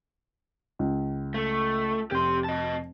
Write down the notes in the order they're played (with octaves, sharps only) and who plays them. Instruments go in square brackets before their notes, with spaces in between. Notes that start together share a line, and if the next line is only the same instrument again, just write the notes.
[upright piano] C#2
[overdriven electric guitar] A3
[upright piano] F1 [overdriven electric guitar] G4 C6
[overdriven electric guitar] D#5 A5